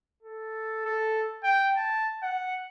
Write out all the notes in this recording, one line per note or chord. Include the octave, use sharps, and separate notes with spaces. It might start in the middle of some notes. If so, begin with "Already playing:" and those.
A4
A4
G5
A5
F#5